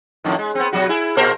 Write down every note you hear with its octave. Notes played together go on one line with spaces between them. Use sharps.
F2 A2 D#3
G#3
B3 C4
B2 F#3 F#4
E4 G#4
A#2 A#4 C5